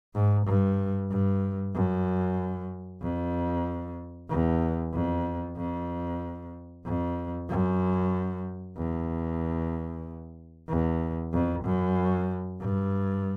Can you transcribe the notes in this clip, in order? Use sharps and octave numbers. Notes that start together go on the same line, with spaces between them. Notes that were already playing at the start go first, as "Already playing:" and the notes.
G#2
G2
G2
F#2
F2
E2
F2
F2
F2
F#2
E2
E2
F2
F#2
G2